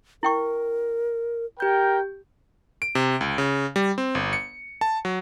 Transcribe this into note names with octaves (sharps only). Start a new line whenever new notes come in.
E4 A#4 G5 C#6
G4 A#4 G5 G6
D7
C3
C#2
C#3
G3
C4
G1
C#7
A5
F#3